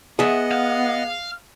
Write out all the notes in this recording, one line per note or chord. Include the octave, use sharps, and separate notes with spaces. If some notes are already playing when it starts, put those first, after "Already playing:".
B3 G#4 D#5 E5 F#5
F5